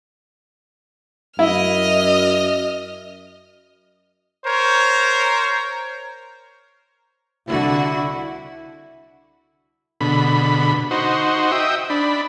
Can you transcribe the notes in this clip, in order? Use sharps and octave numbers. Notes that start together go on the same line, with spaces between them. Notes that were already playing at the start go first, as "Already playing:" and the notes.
F#2 E4 D#5 F6
A#4 C5 C#5
C2 D3 E4 F#4
B2 D3 B5
D#4 F#4 C5
D#5 E5 G5
D4 B5